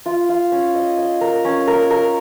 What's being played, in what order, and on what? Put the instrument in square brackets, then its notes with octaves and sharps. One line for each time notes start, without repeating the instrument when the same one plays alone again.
[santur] F4
F4
C#4
D#5
D#5
A#4
C#4
A#4
A#4